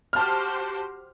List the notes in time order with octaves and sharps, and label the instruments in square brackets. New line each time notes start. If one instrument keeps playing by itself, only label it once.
[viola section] F#4 G4 C5 [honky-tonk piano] A5 F6